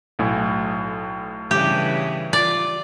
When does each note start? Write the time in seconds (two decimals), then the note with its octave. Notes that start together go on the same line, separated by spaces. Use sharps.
0.19 B1 A2 G#5
1.51 G2 C#3 E3 G4
2.33 F4 D5